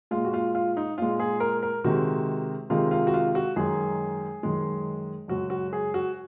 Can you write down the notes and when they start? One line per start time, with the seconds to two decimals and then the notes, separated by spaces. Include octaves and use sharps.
0.11 A#2 G#3 F4
0.25 F#4
0.34 F4
0.55 F4
0.77 D#4
0.98 A#2 G#3 F4
1.19 G#4
1.40 A#4
1.63 A#4
1.84 C3 D#3 G#3 F#4
2.70 C3 D#3 G#3 F4
2.91 F4
3.07 F#4
3.14 F4
3.35 F#4
3.56 F#2 D#3 G#3 G#4
4.43 F#2 D#3 G#3
5.28 F#2 C#3 G#3 F#4
5.50 F#4
5.73 G#4
5.94 F#4